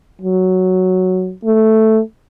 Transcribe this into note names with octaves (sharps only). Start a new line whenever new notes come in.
F#3
A3